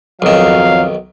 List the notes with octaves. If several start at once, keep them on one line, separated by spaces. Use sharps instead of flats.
B1 F2 D#3 F#3 F5